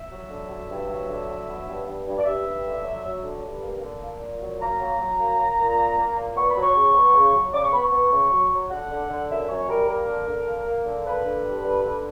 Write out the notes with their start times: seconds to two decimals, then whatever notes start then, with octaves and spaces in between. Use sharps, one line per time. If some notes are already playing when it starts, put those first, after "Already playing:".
Already playing: E5
0.11 F#3
0.30 D3
0.50 F#3
0.70 G2
0.89 F#3
1.09 D3
1.28 F#3
1.48 B3
1.68 G2
1.86 G2
2.06 G2
2.18 D5
2.25 G2 E5
2.45 G2
2.64 D3
2.84 F#3
3.04 F#3
3.23 D3
3.43 G2
3.63 A#3
3.82 D3
4.02 A#3
4.21 A#2
4.41 F#3
4.60 A#3 A#5
4.80 F#3
4.99 F#3
5.18 A#3
5.38 A#3
5.59 A#2
5.78 A#3
5.98 A#3
6.16 A#2
6.36 B3 C#6
6.50 B5
6.56 F#3
6.63 C#6
6.75 C#3
6.94 B3
7.14 C#3
7.33 F#3
7.53 C#3 D6
7.63 C#6
7.73 B3 B5
7.83 C#6
7.92 B3
8.12 C#3
8.31 F#3
8.52 F#3
8.71 D3 F#5
8.90 D3
9.09 D3
9.29 F#2 E5
9.49 F#2 C#5
9.68 G3 A#4
9.88 A#3 A#4
10.07 D3
10.27 D3
10.46 A#3
10.66 A#3
10.86 D3
11.05 A#3 B4
11.25 D3
11.44 G2
11.64 D3
11.83 D3